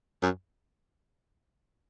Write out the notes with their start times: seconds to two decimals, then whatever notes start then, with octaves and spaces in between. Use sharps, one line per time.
0.22 F#2